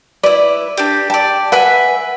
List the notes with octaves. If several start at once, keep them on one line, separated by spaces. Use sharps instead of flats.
E4 B4 D5
D4 G4
G4 D5 A5
B4 E5 F#5 G#5